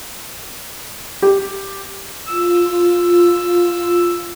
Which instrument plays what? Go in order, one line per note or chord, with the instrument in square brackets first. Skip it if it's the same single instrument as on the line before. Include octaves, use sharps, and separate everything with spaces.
[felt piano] G4
[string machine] F4 [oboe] E6